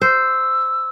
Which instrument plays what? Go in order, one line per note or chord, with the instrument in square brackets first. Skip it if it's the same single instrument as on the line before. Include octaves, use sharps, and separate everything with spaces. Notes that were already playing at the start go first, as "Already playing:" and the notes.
[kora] C5 [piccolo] E6